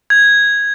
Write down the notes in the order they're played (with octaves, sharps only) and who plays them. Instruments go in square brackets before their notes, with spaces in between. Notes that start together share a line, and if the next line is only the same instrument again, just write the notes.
[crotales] G#6